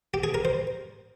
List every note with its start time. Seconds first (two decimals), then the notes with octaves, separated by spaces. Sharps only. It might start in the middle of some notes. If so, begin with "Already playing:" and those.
0.14 G4
0.24 G#4
0.34 A#4
0.45 C5